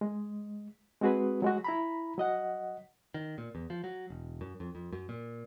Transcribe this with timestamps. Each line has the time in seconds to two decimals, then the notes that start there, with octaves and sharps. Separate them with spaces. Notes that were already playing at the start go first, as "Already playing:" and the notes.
0.01 G#3
1.01 G#3 C4 F#4 G#4 B4
1.42 F#3 G#3 F#4
1.64 E4 A#5 B5
2.18 F#3 D#5 F#5
3.14 D#3
3.38 A#2
3.55 E2
3.70 F3
3.84 F#3
4.10 E1
4.41 F#2
4.60 F2
4.75 F2
4.92 F#2
5.09 A#2